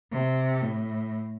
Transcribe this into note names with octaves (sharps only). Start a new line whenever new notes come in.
C3
A2